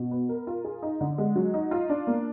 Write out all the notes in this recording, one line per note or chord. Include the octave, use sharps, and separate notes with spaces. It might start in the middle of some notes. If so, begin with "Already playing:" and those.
Already playing: B2
B3
A#4
F4
G#4
D#4
D3
G#3
F#3
D#4
F4
D4
A#3